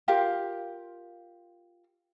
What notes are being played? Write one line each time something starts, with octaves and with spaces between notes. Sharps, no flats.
F4 G4 A#4 F5